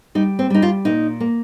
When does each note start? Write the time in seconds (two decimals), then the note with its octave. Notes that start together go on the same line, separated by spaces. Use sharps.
0.15 G3 D#4
0.39 C4
0.50 G3 D#4
0.62 F4
0.85 A#2 D#4
1.20 A#3